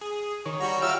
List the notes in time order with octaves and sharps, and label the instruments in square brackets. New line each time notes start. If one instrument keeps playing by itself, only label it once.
[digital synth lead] G#4
[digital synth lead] D#3 [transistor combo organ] C#5
[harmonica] G3 F#4 [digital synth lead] A#5
[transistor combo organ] F4 G4 E5 [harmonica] C#5 E6 F6 [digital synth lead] D7